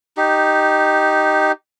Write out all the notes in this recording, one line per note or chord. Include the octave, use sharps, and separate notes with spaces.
D#4 G4